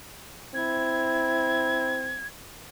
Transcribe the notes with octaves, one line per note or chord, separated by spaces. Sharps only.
C4 E4 G#6